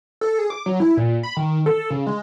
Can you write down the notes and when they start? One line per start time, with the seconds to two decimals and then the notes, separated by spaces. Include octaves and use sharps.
0.21 A4
0.38 G#4
0.50 D6
0.66 F#3
0.80 E4
0.97 A#2
1.23 B5
1.37 D#3
1.66 A4
1.91 C#3
2.07 G#3